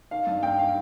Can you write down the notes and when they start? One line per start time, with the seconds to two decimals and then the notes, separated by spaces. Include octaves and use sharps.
0.11 D#3 F5
0.27 G2
0.43 G2 G5
0.58 D#3 F5